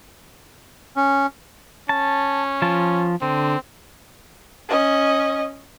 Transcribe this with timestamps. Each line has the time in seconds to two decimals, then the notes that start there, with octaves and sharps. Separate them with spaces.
0.96 C#4
1.89 C#4 A5
2.62 F3 F4 A5
3.22 D3 C4
4.69 C#4 D#5